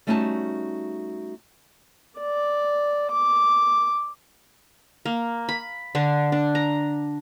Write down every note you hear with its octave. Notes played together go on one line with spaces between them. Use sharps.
G3 A3 C#4 D#4 F#4 A5
D5
D6
A#3
B5
D3 D4
D4
A#5